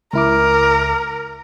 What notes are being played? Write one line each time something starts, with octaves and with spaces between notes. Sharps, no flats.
C#2 E4 A#4 D6